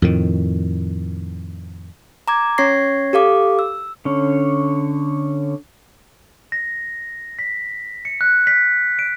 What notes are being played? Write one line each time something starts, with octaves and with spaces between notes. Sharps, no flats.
F2 A2 D#3
A#5 D6 G#6
C#4 C#5 C#6 G#6 A#6 C7
G4 A4 F5 D6
E6
D3 C#4
A#6
B6
C#7
F#6
B6
D7